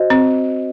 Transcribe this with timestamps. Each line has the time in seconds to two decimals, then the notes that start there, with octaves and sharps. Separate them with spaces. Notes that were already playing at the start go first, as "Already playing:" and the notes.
Already playing: F#4 C5 D#5
0.10 C4